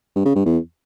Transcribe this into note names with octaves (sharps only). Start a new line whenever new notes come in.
G2
C#3
G2
E2